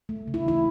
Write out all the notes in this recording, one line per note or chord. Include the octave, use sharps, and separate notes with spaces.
A3
C#3
E4
E3 E4